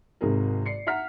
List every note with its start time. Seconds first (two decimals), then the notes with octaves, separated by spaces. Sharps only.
0.21 G#1 G#2 C3 G#4 A#4
0.66 D5 C7 C#7
0.87 E5 F#5 A#5 F6 B6